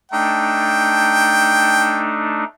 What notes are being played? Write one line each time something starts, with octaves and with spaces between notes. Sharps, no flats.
A3 D4 D#4 G5